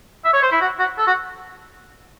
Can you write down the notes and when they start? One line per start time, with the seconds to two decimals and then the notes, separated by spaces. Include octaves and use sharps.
0.24 E5
0.33 C#5
0.43 C5
0.51 E4
0.61 F#4
0.79 F#4
0.98 A4
1.07 F#4